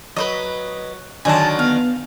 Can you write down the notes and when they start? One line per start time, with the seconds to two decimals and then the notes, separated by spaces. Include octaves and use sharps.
0.16 F#3 B4 C5 D#5
1.25 D3 D#3 F#3 G#4 A5
1.59 B3 F5